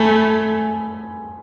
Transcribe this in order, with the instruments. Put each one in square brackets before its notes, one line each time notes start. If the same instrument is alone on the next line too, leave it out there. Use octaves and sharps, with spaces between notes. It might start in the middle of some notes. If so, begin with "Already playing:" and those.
Already playing: [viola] A3 [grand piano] G#5 B5